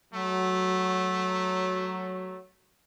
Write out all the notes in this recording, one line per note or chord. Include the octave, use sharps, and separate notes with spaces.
F#3 A3